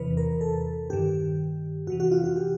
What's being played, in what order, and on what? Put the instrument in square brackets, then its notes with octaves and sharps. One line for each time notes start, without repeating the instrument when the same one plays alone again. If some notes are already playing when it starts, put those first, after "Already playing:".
Already playing: [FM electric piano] E2 C3 E3 B4
A#4
A4
G2 D#3 G4
F2 C3 E3 F#4
F#4
F4
F#4
G4